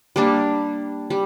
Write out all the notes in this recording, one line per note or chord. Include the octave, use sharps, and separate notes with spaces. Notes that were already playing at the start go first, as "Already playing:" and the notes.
G3 A#3 D4
G3